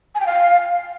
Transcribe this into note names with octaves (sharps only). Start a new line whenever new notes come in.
G#5
G5
F5